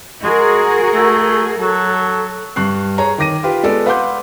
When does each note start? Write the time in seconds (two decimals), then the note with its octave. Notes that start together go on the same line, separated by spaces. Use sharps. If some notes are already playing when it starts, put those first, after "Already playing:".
0.23 G#3 F#4 G#4 A#4
0.94 A3
1.58 F#3 A4
2.56 G2 C#6 F#6 C7
2.98 G#4 C#5 A#5
3.18 D#3 D6 A#6 D#7
3.43 F4 G4 B4
3.64 G#3 B3 A4 D5
3.86 B4 F5 F#5 C6 D6 G6